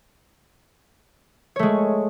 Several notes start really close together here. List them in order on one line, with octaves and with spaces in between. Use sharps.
C#5 A3 G#3